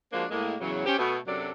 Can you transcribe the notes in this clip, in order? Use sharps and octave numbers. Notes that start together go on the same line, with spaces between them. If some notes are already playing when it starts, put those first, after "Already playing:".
F3 G#3 A#3 D4 F#4 C5
A2 G#3 A#3
E2 C#3 E3 F#3
C#4 G4 C5
B2 A3 B3
F#2 C3 F#3 D4 A4 D5